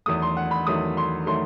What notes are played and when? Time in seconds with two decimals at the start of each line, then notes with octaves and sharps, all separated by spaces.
0.06 E2 D#3 F#3 A3 D#6
0.22 C6
0.37 F#5
0.51 B5
0.67 E2 D#3 F#3 A3 D#6
0.97 C6
1.26 D#3 F#3 A3 C6